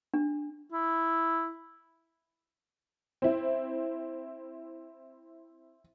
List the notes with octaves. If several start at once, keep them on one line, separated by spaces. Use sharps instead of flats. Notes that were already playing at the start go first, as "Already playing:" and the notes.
D4
E4
C4 E4